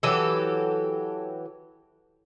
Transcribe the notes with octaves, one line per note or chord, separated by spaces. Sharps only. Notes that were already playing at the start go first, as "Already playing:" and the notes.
E3 F#3 G4 A4